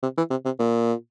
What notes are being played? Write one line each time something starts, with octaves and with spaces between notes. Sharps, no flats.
C3
E3
C3
C3
A#2